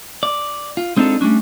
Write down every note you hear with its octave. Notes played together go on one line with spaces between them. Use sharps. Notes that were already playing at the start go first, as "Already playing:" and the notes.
D5
F4
G#3 C4 D4 D#4 F4 A4
G3 A3 A#3 C#4 D4